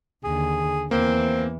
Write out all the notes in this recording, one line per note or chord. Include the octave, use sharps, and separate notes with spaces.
D#2 D3 G#4
E2 E3 A#3 C4